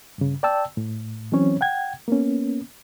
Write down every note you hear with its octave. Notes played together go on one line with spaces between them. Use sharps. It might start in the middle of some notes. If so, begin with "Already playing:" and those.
G2 C#3
D5 G5 A5 E6
A2
E3 F#3 C4 C#4 C#5
F#5 G5 G#6
A#3 B3 C#4